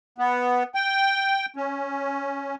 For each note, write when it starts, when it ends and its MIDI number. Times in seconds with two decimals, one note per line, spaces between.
0.18 0.63 59
0.75 1.46 79
1.56 2.55 61